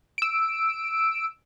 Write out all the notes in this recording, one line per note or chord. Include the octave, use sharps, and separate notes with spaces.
E6 D7